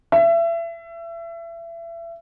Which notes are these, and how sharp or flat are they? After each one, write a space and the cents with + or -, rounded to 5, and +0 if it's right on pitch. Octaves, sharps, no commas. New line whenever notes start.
E5 +30